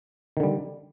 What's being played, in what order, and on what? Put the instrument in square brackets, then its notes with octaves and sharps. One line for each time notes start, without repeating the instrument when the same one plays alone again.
[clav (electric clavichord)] D#3
D3
G3